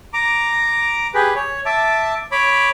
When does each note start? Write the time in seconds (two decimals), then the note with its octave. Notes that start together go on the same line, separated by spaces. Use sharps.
0.13 A#5 D6
1.14 G4 G#4 B4
1.35 C#5
1.66 E5 A5 D6
2.32 C#5 B5 D6